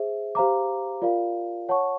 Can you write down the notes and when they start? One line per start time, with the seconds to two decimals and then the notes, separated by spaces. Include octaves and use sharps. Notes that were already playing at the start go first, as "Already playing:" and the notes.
Already playing: G#4 C5 E5
0.35 G4 C5 F5 A#5 D6
1.02 F4 A#4 D5 F5
1.69 C#5 F#5 A5 C#6